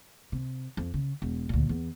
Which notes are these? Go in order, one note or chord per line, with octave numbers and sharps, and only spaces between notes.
C3
F2
C#3
E1
D2 A#2
E2